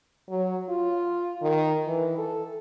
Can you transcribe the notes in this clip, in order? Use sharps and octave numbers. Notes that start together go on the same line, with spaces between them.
F#3
F4
D#3
E3
A4